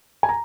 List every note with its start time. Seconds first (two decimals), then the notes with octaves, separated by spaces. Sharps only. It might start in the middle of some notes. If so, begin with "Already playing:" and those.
0.23 G#5
0.29 A#5